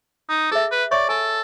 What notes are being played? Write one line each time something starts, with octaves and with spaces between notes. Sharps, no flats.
D#4
G#4 A4 E5
B4
C#5 D5 E5 C#6
A4 G#5 A5